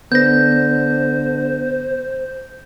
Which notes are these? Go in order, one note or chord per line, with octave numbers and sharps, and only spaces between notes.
D3 B3 C5 G6 A#6